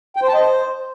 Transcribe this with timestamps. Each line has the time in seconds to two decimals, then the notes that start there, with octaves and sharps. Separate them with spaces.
0.16 G5
0.22 C5
0.28 A5
0.34 D#5
0.40 C5